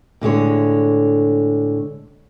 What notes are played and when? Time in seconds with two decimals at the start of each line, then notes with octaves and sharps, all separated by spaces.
0.21 A2 D3 G#3 C#5